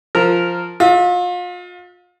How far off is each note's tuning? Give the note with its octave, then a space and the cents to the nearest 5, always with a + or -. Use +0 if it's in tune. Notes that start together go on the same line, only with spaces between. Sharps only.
F3 +0 A#4 -10
F4 +35 E5 -30